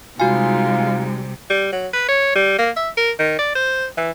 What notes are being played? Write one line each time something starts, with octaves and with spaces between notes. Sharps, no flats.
C3 G3 G#3 D#4 F4 F#4 G#5
G3
F#3
B4
C#5
G3
A#3
E5
A#4
D#3
D5
C5
E3